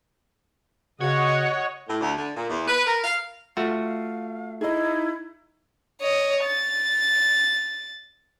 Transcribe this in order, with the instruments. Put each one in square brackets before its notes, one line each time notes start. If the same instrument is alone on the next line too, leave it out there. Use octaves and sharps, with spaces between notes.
[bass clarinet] C#3 [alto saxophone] F#4 [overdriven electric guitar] C#5 [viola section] D#5 F#5
[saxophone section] A2
D2
D3
A#2
E2
B4
A#4
F5
[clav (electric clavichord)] A3 F#4 [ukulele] F4 [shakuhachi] F5
[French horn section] D#4 [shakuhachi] E4 [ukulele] G#4 D#5
[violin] C#5 D#5
A6